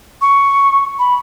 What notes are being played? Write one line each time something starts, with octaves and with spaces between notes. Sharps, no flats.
C#6
B5